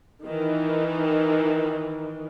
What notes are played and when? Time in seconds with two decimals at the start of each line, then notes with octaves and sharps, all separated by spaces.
0.25 D#3 E3